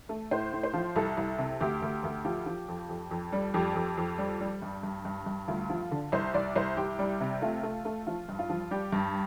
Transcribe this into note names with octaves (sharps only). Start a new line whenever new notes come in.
A3
A2 C5
A2
C5
F3
C2 A4
C2
C3
D2 G4
D2
D2
F3 G4
F3
F2
F2
F2
G3
F2 G4
F2
F2
G3
G3
G2
G2
G2
G2
D2 F4
F3
D3
C2 C5
C2 D5
C2 C5
C2 G4
G3
C3
A3 F4
A3
A3
F3 F4
G2
F4
F3
G3 G4
G2